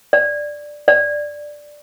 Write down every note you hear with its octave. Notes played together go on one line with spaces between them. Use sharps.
D5
D5